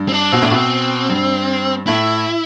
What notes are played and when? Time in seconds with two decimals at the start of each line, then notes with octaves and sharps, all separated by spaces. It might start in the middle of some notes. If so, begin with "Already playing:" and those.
Already playing: G2
0.08 C4
0.12 D4
0.32 B2 C4
0.42 A2 D4
0.51 B2 C4
1.09 G2
1.87 A2 E4